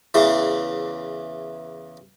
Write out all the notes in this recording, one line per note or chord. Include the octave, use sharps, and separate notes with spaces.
E2 C#3 E3